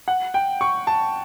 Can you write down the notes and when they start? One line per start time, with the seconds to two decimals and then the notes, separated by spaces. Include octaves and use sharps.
0.08 F#5
0.34 G5
0.61 C#6
0.87 A5